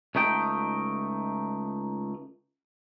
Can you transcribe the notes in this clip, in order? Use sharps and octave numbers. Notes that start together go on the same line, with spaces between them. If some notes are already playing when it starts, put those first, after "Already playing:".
C#2 A3 D#4 G5